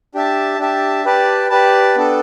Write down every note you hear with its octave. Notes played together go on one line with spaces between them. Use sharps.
D4 G4 E5 A5
D4 G4 E5 A5
G4 B4 D5 A5
G4 B4 D5 A5
B3 D4 A4